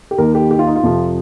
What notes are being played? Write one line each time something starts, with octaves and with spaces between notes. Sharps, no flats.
G4
D#2 D#3 A#4
G4
G4
F4
D#4
F4
F2 C3 F3